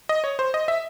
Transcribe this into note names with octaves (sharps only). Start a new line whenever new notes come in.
D#5
C#5
C5
D#5
E5